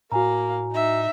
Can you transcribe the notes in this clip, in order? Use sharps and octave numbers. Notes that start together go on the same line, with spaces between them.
A2 A#3 F#4 F5 G#5 A#5
D#4 E5